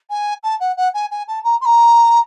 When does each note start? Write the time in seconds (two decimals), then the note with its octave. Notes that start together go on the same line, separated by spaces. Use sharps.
0.10 G#5
0.43 A5
0.60 F#5
0.77 F#5
0.94 G#5
1.11 G#5
1.28 A5
1.44 A#5
1.61 C6
1.65 A#5